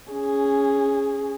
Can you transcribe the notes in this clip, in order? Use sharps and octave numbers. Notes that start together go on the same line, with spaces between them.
C#4 G#4